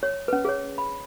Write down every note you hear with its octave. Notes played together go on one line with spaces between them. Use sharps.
C#5
C#4 B4
G#4 C#5
B5